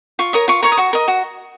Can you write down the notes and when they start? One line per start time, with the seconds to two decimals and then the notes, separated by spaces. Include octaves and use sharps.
0.19 F4 C#6
0.33 A#4 C#5 D#6
0.48 F4 C#6
0.63 A#4 C#5 C#6
0.72 D#6
0.77 F#4 C#6
0.93 A#4 D#5
1.08 F#4